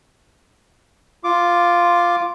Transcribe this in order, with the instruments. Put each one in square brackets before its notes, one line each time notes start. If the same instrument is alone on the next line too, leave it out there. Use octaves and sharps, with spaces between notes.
[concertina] F4 D6